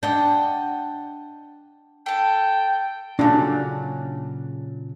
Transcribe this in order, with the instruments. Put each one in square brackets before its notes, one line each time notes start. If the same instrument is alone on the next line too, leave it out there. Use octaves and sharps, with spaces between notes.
[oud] D4 [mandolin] D#5 F#5 G5
[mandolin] A4 A5 [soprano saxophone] G5
[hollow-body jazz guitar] A#2 C#3 F#3 [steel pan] D4